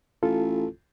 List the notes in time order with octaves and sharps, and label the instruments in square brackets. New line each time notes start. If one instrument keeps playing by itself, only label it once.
[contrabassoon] A1 [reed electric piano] F4 A4